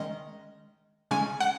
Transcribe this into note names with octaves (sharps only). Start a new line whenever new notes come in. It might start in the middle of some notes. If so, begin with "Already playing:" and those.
Already playing: D#3 G#3 C#4 D#5
C#3 G#3 C#4 G#5
F#5